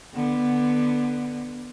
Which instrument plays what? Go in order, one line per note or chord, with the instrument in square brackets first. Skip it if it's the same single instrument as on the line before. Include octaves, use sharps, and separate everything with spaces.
[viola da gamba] D3 B3